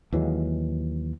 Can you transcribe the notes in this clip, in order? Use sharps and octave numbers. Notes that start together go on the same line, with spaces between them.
D#2 E3 F#3 G#3